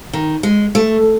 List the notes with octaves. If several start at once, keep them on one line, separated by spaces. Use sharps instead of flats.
D#3
G#3
A3